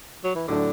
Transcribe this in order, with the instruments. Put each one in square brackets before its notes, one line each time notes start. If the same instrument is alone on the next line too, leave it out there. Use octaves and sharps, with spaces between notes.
[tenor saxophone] F#3
E3
[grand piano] A2 F#3 A3 D4 [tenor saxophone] D3